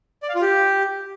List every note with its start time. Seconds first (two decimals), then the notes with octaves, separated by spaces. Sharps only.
0.23 D5
0.29 F5
0.35 F4
0.41 G4